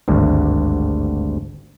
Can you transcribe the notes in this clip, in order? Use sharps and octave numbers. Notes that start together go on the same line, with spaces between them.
G#1 D2 G2